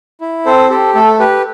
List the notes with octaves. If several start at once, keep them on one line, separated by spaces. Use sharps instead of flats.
E4
C4 A4 C5
G4 A4
A3 A4
G4 B4